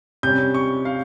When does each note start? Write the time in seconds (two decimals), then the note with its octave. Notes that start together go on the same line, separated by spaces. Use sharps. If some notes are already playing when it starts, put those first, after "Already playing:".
0.23 C3 G3 C#4 G6
0.54 C#6
0.85 F5